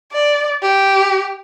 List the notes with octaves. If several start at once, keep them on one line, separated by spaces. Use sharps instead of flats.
D5
G4